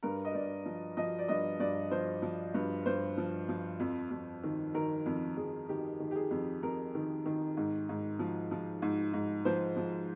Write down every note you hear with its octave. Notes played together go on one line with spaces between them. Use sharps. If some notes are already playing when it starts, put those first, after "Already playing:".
G2 A#4
D#5
G2 D5
F3
F3 D#5
D5
G2 D#5
G2 D5
F3 C5
F3
G2
G2 C5
F3
F3
F2
F2
D#3
D#3 A#4
F2
F2 G#4
D#3 G4
D#3
G4
G#4
F2
F2 A#4
D#3
D#3
G#2
G#2
F3
F3
G#2
G#2
F3 C5
F3